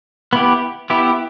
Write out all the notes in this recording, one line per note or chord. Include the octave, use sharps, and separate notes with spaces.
B3 E4 G4
B3 E4 G4